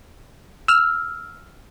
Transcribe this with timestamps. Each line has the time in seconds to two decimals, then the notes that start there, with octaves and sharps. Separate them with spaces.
0.68 E6 F6